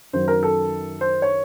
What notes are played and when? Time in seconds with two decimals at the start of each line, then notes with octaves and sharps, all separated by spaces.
0.13 F#2 D#3 F#3 C5
0.28 A#4
0.43 A4
1.01 C5
1.22 C#5